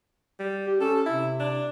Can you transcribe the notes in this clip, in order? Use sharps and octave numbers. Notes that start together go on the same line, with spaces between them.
G3
G4
C#4 A4
C3 E4
D4